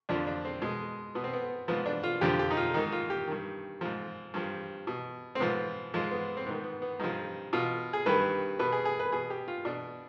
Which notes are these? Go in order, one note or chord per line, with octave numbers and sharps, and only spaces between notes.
F2 D3 F3 D4
D4
C4
B2 G#3
B2 B3
C4
B3
G#2 F3 B3
D4
F4
F2 D3 F3 G4
G4
D#4
F4
G#2 D#3 D#4
F4
G4
G2 D#3
G#2 F3
G2 F3
B2
C4
G#2 F3 B3
G#2 F3 G#3
B3
C4
G#2 D#3 B3
B3
B3
G2 F3 D#4
B2 F4
G#4
G2 D#3 B4
B2 B4
G#4
G#4
B4
B2 G#4
G4
F4
B2 D4